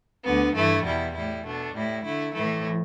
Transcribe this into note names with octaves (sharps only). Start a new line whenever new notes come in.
D2 D3 B3
G2 E3 A3 E4
E2 B2 G3 E4
A2 G3 E4
B2 A3 D4
A2 G3 E4
D3 A3 E4
A2 E3 A3 E4